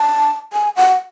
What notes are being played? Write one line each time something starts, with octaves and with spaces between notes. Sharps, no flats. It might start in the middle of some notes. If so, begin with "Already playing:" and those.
Already playing: A5
G#5
F#5